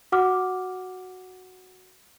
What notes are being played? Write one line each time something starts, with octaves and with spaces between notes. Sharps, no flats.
F#4 F#5 D6 F6